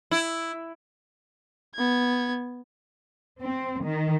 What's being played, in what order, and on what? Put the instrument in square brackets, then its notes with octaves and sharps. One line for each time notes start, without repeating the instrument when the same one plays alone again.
[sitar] E4
[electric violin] B3 G#6
[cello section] C4
D#3